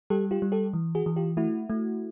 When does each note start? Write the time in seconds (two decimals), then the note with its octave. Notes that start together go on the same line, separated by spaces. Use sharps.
0.10 G3 G4 A4
0.31 F4 G4
0.42 G3
0.52 G4 A4
0.73 E3
0.95 F#4 G#4
1.06 E3
1.16 F4 G4
1.37 A3 E4 F#4
1.70 A3